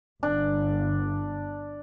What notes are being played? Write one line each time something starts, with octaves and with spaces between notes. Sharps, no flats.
G1 D4